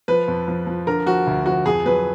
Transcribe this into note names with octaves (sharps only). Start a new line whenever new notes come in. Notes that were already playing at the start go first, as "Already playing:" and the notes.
F3 B4
F2
F3
F3
D3 A#4
F3 F#4
D2
F3 F#4
F2 G#4
F#3 B4